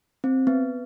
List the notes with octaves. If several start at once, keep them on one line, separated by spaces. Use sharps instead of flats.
C4
B3